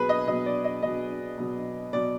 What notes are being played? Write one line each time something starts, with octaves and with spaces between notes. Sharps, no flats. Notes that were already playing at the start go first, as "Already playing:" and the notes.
Already playing: B2 F#3 G#4 B4 B5
D#5
B2 F#3 D#5
D5
D#5
B2 F#3 D#5
B2 F#3
B2 F#3 D5